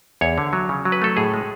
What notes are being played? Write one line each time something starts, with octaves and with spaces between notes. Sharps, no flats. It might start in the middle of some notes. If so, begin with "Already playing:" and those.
E2 C#5
D3
F#3
C#3
F#3
B4
A3 A4
A2 G#4
G#3